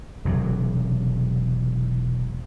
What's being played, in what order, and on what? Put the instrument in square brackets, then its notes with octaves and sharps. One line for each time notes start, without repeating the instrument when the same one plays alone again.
[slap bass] E1 C3 F#3